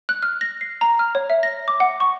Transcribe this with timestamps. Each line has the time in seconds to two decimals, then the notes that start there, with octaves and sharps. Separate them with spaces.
0.09 F#6
0.23 F6
0.41 A#6
0.61 C7
0.81 A#5
0.99 F6
1.15 C#5
1.30 E5
1.43 A#6
1.68 D6
1.80 F#5
2.00 C#6